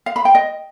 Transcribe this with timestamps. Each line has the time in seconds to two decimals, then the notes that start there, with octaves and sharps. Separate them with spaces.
0.06 F5
0.16 B5
0.25 G5
0.35 D#5